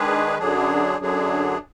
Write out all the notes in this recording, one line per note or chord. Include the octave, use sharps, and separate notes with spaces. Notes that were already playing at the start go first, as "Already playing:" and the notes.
Already playing: D#3 G#3 D4 G#4 B4
F#2 D3 F#3 D4 G#4
F#2 D3 F#3 D4 G#4